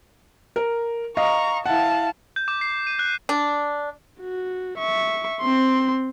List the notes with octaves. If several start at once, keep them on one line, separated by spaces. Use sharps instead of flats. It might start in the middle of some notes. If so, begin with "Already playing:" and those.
A#4
D#5 F5 A#5 C#6
E4 F5 F#5 A5
G6
D6
C7
D#7
F#6
D4
F#4
E5 C#6
C4 C6